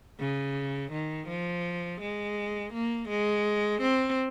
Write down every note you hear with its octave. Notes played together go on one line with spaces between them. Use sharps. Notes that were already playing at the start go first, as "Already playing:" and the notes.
C#3
D#3
F3
G#3
A#3
G#3
C4